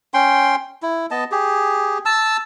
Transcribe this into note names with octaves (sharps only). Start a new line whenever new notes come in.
C#4 G5 C6
E4
B3 D#5 A5
G4 G#4
A5 E6